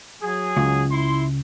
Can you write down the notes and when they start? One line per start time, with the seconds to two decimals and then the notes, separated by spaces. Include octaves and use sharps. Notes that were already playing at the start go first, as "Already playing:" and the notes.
0.22 F#3 G#4
0.57 C#2
0.91 E4 C6